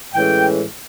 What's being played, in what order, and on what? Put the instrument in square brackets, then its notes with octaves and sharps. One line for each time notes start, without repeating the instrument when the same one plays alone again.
[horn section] A2 E3 G#3 C#4 G5